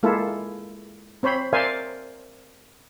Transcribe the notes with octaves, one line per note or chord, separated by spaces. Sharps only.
G#3 A#3 E4 F4 A4
C4 C5 C#5 B5
A#4 C5 D5 E5 F5 G#5